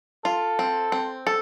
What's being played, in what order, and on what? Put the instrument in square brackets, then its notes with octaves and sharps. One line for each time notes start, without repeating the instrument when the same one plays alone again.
[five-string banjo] F4 [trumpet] A4
[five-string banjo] C4
C4
A4